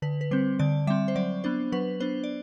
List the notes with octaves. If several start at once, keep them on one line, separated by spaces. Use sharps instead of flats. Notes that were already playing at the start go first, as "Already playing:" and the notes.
D3 B4
B4
G3 C4 C5
D3 D5
G3 C4 E5
C5
F#3 D5
B3 D4 C5
F#3 B4
B3 D4 C5
D5